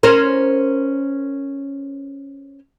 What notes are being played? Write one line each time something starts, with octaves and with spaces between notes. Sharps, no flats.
C#4 A#4 C5